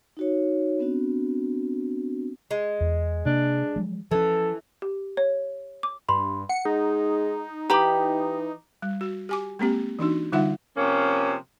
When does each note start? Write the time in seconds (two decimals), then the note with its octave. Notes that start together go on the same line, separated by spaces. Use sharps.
0.17 D#4 F#4 C#5
0.79 B3 C4 D4 F#4
2.51 G#3
2.81 E2
3.26 C3 A#3 D4
3.76 F3 F#3 G#3
4.11 E3 F3 C#4 A4
4.82 G4
5.17 C#5
5.83 D6
6.09 G2 B5 C6
6.49 F#5 C#7
6.65 G#3 D#4
7.70 E3 G4 G5 A#5 B5 D6
8.82 G3
9.01 F#4
9.29 G4 G#5 D6
9.59 G#3 A#3 C4 G4
9.99 E3 D4 D#4 F#4
10.32 D3 G3 D#4 F4 E5 F#5
10.77 C3 F3 A#3 C#4